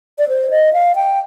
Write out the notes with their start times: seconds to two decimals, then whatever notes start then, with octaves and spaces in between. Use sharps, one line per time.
0.19 D5
0.29 C5
0.50 D#5
0.73 F5
0.95 G5